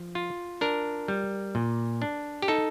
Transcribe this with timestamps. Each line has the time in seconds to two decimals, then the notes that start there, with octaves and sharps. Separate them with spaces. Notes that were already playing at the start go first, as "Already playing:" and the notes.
Already playing: F3
0.15 F4
0.61 D4 A#4
1.08 G3
1.55 A#2
2.02 D4
2.42 G4
2.48 D#4 A4